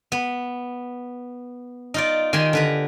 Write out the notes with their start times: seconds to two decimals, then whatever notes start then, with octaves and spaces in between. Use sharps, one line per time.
0.12 B3
1.94 D#4 F4 D5
2.33 D#3 G4 G#5 C6
2.53 D3 B4 A#5